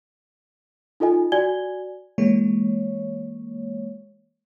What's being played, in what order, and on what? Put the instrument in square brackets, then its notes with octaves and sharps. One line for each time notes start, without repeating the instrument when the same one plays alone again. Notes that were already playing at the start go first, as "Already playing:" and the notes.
[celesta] D#4 F4 A4 D#5 G#5
F#4 D5 G#5 G#6 G7
[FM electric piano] E3 G#3 A#3 C#5